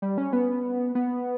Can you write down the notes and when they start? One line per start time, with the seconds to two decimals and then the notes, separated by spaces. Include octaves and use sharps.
0.02 G3
0.18 C#4
0.33 B3
0.95 B3